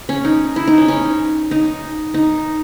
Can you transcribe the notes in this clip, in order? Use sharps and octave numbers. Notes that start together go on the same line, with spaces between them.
C#4
D#4
E4
D#4
C#4
C#4
D#4
D#4